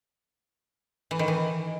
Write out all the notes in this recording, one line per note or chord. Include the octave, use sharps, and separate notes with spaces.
E3
D#3
E3